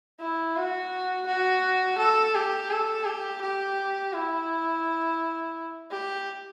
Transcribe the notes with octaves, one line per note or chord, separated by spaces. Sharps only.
E4
F#4
F#4
A4
G4
A4
G4
G4
E4
G4